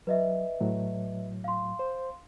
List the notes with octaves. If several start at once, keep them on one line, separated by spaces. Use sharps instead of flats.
F#3 B4 D#5 E5
A2 F#3
F5 C6
C5